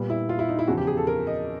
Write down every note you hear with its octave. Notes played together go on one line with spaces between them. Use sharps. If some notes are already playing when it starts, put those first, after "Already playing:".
Already playing: A#2 G3 B3
E4
F4
E4
D#4
E4
E2 C#3 F3 F#4
G4
G#4
A4
A#4
D#5